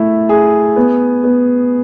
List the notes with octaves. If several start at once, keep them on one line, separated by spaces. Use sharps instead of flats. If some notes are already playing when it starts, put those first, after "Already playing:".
Already playing: A3 E4
G#4
B3
B3